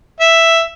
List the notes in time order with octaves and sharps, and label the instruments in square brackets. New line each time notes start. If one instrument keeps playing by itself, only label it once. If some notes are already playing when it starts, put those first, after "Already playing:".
[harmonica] E5